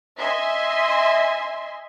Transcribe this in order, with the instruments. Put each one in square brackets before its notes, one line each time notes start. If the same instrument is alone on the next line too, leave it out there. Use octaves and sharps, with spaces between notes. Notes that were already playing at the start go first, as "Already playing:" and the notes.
[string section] D#5 E5 G#5 C6